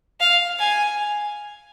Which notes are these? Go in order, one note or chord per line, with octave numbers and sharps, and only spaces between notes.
F5
G#5